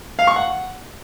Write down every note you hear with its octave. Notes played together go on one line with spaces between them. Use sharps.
F5
C#6
F#5